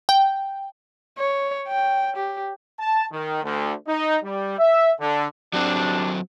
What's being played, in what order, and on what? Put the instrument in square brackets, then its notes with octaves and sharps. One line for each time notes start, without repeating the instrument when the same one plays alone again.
[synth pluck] G5
[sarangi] C#5
G5
G4
[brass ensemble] A5
D#3
D2
D#4
G3
E5
D3
[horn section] F#2 G3 D4 [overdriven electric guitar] F#3 C4